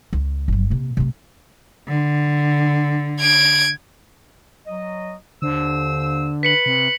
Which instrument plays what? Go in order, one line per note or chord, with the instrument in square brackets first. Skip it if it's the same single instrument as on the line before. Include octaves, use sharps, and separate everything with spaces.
[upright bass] C#2
G1 F#3
C3 A#3
C3 A3
[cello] D3
[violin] G#6 D7
[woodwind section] F#3 D#5
[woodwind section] D#2 C5 E6 [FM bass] D3
[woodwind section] B4 [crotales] B6 C#7 F#7
[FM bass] C3